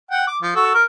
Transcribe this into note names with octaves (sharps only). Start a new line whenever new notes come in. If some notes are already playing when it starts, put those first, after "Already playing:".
F#5 G5
D6
F3
F#4 A4
A#4